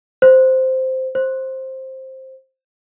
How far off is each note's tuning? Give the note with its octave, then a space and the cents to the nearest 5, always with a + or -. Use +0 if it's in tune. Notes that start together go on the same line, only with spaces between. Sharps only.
C5 -5
C5 +10